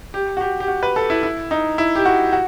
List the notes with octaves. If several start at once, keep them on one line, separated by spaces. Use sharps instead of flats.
G4
F#4
G4
G4
F#4
B4
A4
E4
E4
D#4
E4
G4
F#4
F#4